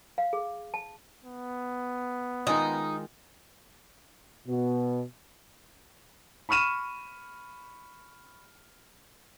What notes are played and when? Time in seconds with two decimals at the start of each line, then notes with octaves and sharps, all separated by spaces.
0.18 F5
0.33 G#4
0.74 A5
1.24 B3
2.47 D#3 G#3 D#4 F4
4.47 B2
6.49 B5 C#6 F6 D#7 E7